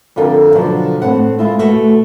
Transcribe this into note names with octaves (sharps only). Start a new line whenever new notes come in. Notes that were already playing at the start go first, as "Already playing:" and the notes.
F2 D3 F4 A4 A#4
B2 D3 F3 F#3
A2 C4 F#5
G#3 E4 F4
B2 A3 F#4